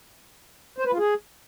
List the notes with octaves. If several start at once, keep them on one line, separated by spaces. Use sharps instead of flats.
C5
B4
F4
G#4